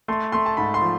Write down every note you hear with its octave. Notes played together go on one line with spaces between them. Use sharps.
A3 C6
A3 C6
A5
G#2 B5
C6
F3